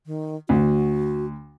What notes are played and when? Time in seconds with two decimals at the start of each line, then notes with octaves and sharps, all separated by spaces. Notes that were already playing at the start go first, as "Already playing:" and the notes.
0.06 D#3
0.49 D2 F#4